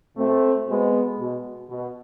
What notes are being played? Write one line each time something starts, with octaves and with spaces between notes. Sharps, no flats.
B2 A3 C4
B2 G#3 B3
B2
B2